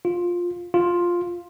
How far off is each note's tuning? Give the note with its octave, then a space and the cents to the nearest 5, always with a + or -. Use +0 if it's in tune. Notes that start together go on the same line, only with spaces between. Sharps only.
F4 +10
F4 +5